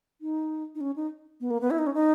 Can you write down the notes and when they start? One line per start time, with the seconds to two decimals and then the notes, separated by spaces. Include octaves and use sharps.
0.21 D#4
0.75 D#4
0.81 C#4
0.96 D#4
1.41 B3
1.51 A#3
1.61 B3
1.71 E4
1.78 D#4
1.87 C#4
1.94 D#4